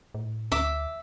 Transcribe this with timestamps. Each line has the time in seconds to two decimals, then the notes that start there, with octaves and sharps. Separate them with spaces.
0.14 A2
0.52 D2 E5 D6